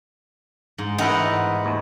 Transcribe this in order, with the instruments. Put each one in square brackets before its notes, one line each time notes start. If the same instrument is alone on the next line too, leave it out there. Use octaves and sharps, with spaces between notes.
[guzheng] G#2
[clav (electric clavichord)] A1 E4 [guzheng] D#4 A#4 B4 [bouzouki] F#5
[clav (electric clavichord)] D#2